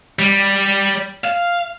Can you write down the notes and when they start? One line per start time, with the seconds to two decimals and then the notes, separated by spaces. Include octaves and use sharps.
0.19 G3
1.25 F5